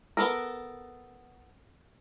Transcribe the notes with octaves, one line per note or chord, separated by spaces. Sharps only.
B3 A4 A#4